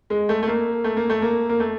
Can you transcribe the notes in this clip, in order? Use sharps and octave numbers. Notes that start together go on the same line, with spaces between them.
G#3
A3
A3
A#3
A3
A#3
A3
A#3
A#3
A3